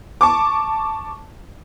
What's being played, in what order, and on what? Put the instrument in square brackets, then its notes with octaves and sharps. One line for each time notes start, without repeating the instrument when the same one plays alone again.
[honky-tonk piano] A5 C#6 D6